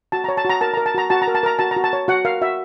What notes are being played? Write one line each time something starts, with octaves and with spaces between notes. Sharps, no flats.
F#4 A5
C#5 A#5
A5
F#4 A#5
A#4 A5
A#4 A#5
A5
F#4 A#5
F#4 A5
A#5
A#4
A5
A#4 A#5
F#4 A5
A#5
F#4
A5
C#5
F#4 F#5
A#4 F5
F#4 E5